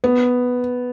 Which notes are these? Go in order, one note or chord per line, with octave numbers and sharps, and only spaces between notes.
B3